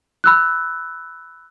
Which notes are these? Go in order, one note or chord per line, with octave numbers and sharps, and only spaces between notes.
B5 E6 F#6